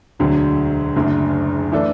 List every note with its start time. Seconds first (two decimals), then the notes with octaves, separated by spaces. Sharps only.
0.20 E1 D2 D3 F#3
0.96 F#1 F#2 D3 A3
1.72 E3 A3 D4 A4